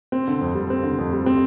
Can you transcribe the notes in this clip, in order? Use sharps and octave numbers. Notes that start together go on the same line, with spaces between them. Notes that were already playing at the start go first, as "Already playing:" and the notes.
C4
D3
F2
G3
C4
D3
F2
G3
C4